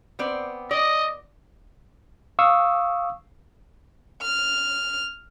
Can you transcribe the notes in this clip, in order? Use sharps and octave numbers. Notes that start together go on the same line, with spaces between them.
B3 C4 D5
D5 D#5
F5 C#6 D#6 E6
F6